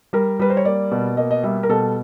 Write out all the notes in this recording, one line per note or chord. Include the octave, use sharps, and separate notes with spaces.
G3 A#4
G3 B4
C5
C#5
A#3 D5
B2
A#3 D#5
D#5
G3 E5
A#4
B2 A4